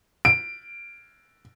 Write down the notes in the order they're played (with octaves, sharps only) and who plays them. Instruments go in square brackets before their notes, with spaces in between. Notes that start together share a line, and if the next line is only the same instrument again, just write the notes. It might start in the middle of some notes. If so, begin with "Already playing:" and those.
[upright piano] D7